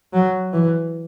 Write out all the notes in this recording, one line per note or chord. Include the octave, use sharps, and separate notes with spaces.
F#3
E3